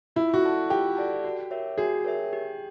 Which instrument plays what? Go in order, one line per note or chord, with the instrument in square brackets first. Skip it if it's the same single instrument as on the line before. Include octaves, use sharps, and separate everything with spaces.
[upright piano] E4 [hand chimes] F4
[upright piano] F#4
[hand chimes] A4 D5 F#5 A5
[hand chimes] F4 [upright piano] G4
[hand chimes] A4 D5 F#5 A5
F#4
A#4 C#5 E5
[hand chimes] F#4 [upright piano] G#4
[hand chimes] A#4 C#5 E5
G4